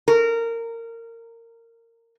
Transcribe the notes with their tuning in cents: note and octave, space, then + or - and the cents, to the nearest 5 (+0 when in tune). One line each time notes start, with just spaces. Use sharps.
A#4 -20